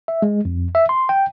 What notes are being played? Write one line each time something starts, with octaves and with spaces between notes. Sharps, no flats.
E5
G#3
F2
E5
C6
G5